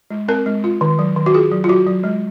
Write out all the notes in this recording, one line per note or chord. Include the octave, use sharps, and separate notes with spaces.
G#3
C4 A#4
G#3
F4
D#3
F#3
D#3
F#4
F4 G#4
F#3
F4
F#3 F#4
F#3
G#3